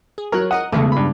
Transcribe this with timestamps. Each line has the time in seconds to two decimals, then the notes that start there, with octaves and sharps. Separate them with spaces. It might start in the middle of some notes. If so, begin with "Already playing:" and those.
0.18 G#4
0.32 F#3 A#4 C#5 F#6
0.51 A#4 D#5 F#5 D#6
0.72 B1 E2 C#3 G#3 A3 B3
0.92 G2 B5